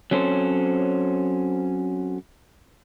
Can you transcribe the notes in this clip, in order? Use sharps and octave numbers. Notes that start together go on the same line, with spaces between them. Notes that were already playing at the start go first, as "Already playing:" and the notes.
F#3 C4 C#4 A4 C5